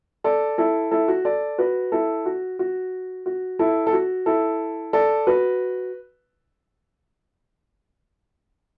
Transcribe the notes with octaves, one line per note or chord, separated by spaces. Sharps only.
A4 D5
E4 A4
E4 A4
F#4
A4 D5
F#4 B4
E4 A4
F#4
F#4
F#4
E4 A4
A4
F#4
E4 A4
A4 D5
F#4 B4